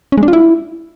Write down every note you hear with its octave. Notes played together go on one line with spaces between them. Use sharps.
C#4
G#3
D4
F4
E4